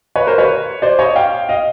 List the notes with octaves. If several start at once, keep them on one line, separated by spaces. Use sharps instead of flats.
B4 C#5
A#4 C5
B4 C#5
C5 D5
C#5 D#5
F5 G5
D#5 F5